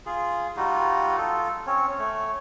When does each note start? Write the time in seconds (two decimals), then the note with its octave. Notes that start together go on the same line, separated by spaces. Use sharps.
0.06 F4 G#4
0.56 G3 D#4 F4 F#4
1.17 F4 A4
1.67 C4 C#4 C#5
1.99 A3 C#5